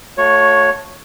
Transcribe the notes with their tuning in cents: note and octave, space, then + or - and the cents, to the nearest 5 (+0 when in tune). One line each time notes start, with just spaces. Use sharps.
A3 +0 F#4 -45 C#5 +0